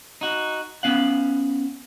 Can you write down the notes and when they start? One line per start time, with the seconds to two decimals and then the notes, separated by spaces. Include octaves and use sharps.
0.21 D#4 F#4
0.83 B3 C#4 F5 F#5